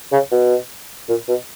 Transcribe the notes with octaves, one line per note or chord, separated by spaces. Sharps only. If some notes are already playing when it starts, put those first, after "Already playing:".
C#3
B2
A#2
B2